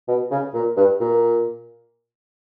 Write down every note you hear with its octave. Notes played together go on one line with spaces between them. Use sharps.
B2
C#3
A#2
G2
A#2